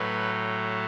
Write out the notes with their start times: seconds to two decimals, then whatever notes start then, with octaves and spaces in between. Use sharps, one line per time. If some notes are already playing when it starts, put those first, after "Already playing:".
Already playing: A2 F#3 A3 B4